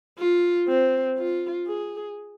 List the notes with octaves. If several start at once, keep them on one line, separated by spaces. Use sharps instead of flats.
F4
C4
F4
G#4